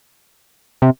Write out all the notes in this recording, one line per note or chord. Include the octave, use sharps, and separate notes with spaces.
C3